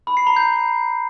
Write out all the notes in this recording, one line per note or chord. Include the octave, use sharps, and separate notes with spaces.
B5
C7
A#5
G6